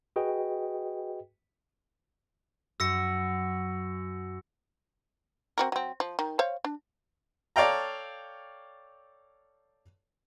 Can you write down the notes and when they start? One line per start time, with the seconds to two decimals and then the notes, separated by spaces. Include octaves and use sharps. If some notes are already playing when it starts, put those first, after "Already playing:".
0.16 F#4 G#4 B4 D#5 G5
2.80 F#2 E6 A#6 C#7
5.58 C4 F#4 A#4
5.72 F#3 C4
6.00 F3
6.19 D#3
6.39 C5 C#5 F5
6.65 D4
7.56 A4 C#5 D5 F5 G5 A#5